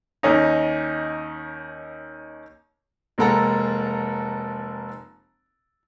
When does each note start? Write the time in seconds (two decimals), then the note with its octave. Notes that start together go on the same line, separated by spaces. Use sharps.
0.23 D#2 C#4 D#4
3.18 F1 G#3 A#3 A4 F#5 A#5